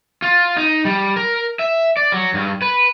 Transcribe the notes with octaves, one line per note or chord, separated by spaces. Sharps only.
F4
D#4
G3
A#4
E5
D5
F#3
G2
B4